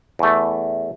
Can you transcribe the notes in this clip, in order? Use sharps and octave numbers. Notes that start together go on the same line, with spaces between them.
E2 A3